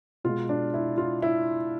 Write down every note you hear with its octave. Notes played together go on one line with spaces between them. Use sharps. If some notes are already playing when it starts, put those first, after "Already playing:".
B2 G#3 F4
D4
E4
F4
E4